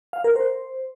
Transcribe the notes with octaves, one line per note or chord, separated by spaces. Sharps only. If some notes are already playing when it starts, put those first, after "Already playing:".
F5
A#4
C5